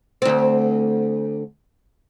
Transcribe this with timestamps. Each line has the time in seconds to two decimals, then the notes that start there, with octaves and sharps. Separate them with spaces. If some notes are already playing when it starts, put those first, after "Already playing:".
0.22 D2 C4